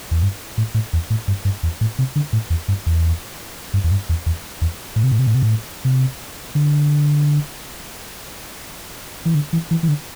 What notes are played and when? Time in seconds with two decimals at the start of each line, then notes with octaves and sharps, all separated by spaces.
0.11 E2
0.23 G2
0.58 A2
0.74 A2
0.93 E2
1.10 A2
1.28 G2
1.45 G2
1.63 E2
1.81 A2
1.98 C3
2.16 D3
2.33 A2
2.50 E2
2.68 G2
2.86 E2
3.74 G2
3.84 E2
3.91 G2
4.09 E2
4.26 E2
4.61 E2
4.96 A2
5.03 C3
5.11 A2
5.19 C3
5.27 A2
5.35 C3
5.42 A2
5.85 C3
6.55 D3
9.25 E3
9.35 D3
9.53 E3
9.71 E3
9.83 E3
9.88 D3